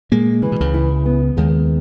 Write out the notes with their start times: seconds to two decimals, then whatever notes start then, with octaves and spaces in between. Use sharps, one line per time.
0.12 A#2 G#3 A#3
0.42 C#3 E3
0.52 B2
0.61 C#2 C#3
0.74 E4
1.05 B3
1.37 D#2 D#3 G#3